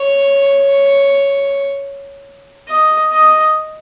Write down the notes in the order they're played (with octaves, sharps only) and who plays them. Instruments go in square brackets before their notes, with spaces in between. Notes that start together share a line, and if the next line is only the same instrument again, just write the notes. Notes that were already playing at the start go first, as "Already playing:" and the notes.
Already playing: [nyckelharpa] C#5
D#5
D#5